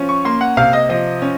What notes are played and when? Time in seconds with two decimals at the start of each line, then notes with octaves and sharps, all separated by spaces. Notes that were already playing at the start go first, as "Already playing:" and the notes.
Already playing: F3 C#4
0.09 C#6
0.25 A#3 C6
0.41 F#5
0.57 C3 F5
0.73 D#5
0.89 F3 D#5
1.22 C#4